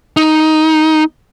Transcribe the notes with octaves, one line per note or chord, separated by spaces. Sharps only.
D#4